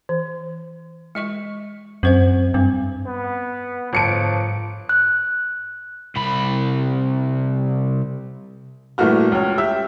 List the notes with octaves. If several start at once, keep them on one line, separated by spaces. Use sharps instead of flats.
E3
G#3 D#5 C#6
F#2 C4 C5 F#5
G2 C4
B3
G1 G#2 F3 A5 C#7 D7
F#6
C2 B5
G2 A#2 E3 A3 F#4 F6
C#2 C#5
G4 E5 E6